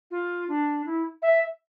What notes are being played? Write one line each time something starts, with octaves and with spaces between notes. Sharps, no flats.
F4
D4
E4
E5